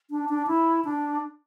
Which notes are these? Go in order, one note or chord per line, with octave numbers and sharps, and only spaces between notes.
D4
D4
E4
D4